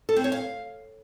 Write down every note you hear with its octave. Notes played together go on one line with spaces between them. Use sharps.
A4
C4
C#5
F5